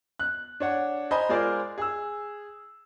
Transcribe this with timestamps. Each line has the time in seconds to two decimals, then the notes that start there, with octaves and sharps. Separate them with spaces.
0.19 F#6
0.60 D4 C#5 F#5
1.11 C5 D#5 G#5 A#5 B5
1.29 G#3 F4 G#4 A#4 C5 D5
1.78 G#4 E6